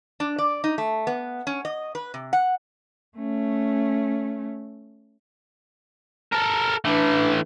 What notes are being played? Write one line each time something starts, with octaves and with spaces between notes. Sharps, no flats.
D4
D5
D#4
A3
B3
C#4
D#5
B4
C3
F#5
A3 C#4
A4 A#4
E3 A3 D4 B4